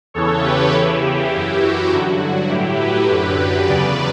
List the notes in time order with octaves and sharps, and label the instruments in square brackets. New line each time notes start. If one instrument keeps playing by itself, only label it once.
[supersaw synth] E2 C#3 E3 A4 C#5
G4 B4
E2 C#3 E3 E4
E4 G4
F#2 E3
F#4
G2 D3 F#3
F#4
A2 F#3 E4 G4
G4 B4
F#2 D3 F#3
E2 C#3 F#3 B4 D5